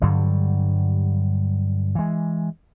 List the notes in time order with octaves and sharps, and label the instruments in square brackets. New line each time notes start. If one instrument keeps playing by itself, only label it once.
[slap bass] G2 D3 F#3 G3
E3 G#3